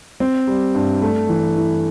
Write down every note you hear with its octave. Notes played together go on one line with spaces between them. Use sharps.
C4
G3
G2
A3
E3
E4